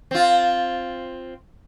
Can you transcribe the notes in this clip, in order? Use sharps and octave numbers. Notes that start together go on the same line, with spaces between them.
C4 F4